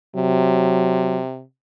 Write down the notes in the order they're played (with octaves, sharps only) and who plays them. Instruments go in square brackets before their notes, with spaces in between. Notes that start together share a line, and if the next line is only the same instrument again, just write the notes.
[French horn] C3 [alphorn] F#3